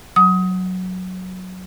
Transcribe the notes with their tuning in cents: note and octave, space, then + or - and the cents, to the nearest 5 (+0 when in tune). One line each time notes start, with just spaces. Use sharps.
F#3 +0 D#6 +25